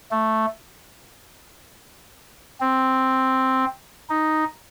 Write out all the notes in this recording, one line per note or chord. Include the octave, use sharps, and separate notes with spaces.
A3
C4
D#4